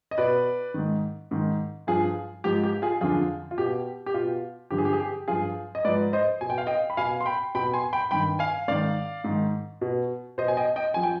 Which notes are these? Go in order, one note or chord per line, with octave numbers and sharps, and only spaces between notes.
D#5
B2 B4 D5
G#2 D#3
G#2 D#3
G2 F3 F4 G#4
G#2 F3 G4
G4
F4 G#4
F2 D3 F3 F4 G#4
F4
B2 G4
G4
B2 F4
G2 D3 F3 G4
G#4
G4
G#4
G4
G2 F3 F4 G#4
D#5
G#2 F3 B4 D5
C5 D#5
B2 G#5
G5
F5
D#5 G5
B5
B2 F5 G#5
C6
G5 B5
B2 G5 B5
G#5 C6
G5 B5
G2 D#3 G5 B5
F5 G#5
G#2 D#3 D5 F5
G#2 D#3
B2
B2 C5 D#5
G#5
D#5 G5
D#5 G5
F3 G#5
G5